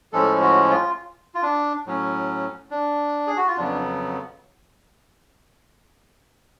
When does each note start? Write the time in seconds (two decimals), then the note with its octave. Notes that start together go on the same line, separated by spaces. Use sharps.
0.13 A2 F3 G#3 C#4 A4
0.41 F#4
0.70 F4
1.35 F4
1.43 D4
1.86 A2 F#3 C#4
2.71 D4
3.27 G#4
3.37 F#4
3.47 F4
3.57 F2 C#3 F#3 B3 D4